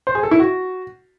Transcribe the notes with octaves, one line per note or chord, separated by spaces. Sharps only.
C5
G#4
A4
E4
F#4